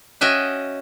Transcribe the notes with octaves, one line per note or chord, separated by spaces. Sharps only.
C#4 F#4 D#5 E5 G5